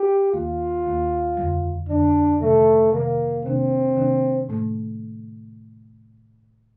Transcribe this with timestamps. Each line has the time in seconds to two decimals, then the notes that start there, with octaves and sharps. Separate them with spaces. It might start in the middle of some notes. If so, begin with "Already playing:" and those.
Already playing: G4
0.33 D#2 D#3 A#3 F4
0.86 D#2 D#3 A#3
1.37 F2 D3 G3
1.89 F2 D3 G3 D4
2.41 C3 D#3 G3 A3
2.93 C3 D#3 G3 A#3
3.45 C3 D#3 A#3 C4 D4
3.97 C3 D#3 A#3 D4
4.49 A2 A3